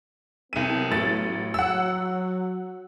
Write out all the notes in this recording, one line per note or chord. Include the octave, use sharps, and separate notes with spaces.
C2 F#3 B3 C#4 D#7
A1 A6
F#3 F#5 E6